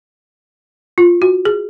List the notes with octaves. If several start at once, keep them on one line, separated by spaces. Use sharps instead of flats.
F4
F#4
G#4